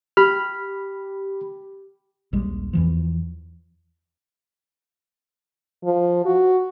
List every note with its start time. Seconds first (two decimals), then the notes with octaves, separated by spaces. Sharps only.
0.17 G4 B5 F6
2.33 D#1 A#1 G3 G#3
2.73 E2 E3 F3
5.85 F3
6.26 F#4